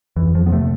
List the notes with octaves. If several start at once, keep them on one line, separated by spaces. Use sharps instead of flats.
F2 E3
F3
B3
C3 A3